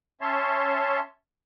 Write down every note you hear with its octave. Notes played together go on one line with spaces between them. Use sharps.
C#4 C#5 E5 A5 C6